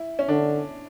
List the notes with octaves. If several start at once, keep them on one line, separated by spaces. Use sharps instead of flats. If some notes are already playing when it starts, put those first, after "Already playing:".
Already playing: E4
C#4
D3 D4